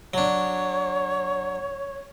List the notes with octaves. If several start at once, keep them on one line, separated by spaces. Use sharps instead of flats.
F#3 D4 C#5